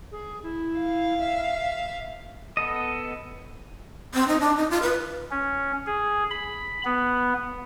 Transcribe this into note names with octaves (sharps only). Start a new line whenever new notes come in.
G#4
E4
F5
E5
B3 A4 D#5
C4
D#4
D4
D#4
F4
B4
C#4
G#4
B5
B3